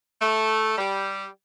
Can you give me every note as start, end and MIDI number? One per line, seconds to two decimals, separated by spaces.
0.22 0.77 57
0.78 1.26 55